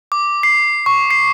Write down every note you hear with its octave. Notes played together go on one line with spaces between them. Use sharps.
D6
C7
C#6
C7